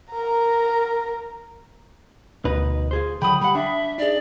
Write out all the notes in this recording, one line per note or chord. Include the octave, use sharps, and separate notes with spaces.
A#4 A#5
D2 B2 D#4 B4
F4 G#4 C5
D3 F#3 G5 B5 D#6
G3 F#5 B5
D4 E5
D#4 G#4 D5